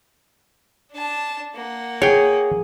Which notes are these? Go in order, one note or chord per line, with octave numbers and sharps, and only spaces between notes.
D4 A5
A#3 F#5
G#4 C#5 G5